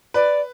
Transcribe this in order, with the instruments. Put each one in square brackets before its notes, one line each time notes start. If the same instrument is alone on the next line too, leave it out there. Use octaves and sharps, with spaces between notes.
[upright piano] B4 [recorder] D5